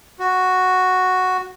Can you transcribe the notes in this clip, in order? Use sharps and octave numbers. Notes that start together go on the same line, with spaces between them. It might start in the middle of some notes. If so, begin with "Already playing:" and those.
F#4